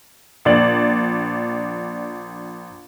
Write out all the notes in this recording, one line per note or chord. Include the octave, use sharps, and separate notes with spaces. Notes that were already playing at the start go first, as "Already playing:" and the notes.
A#1 D5 F#7